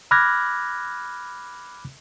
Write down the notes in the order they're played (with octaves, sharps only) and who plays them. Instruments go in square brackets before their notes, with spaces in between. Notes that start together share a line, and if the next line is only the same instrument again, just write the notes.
[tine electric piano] B5 D6 F6 F#6 G#6 A#6